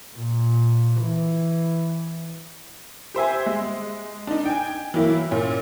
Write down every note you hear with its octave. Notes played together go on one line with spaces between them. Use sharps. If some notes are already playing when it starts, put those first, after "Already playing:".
A#2
E3
G4 C5 E5 G#5
G#3
D4 D#4
G5 G#5
E3 F#3 A#3 E4
A#2 C#4